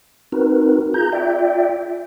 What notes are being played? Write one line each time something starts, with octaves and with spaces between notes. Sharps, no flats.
C4 D#4 F#4 A#4 B4
F4 G#4 A#5 G6
F4 D5 E5 G5